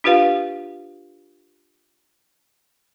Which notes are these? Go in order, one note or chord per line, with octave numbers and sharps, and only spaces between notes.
D4 F4 G4 B4 F5